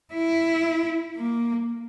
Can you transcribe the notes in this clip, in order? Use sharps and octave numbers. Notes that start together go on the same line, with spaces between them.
E4
A#3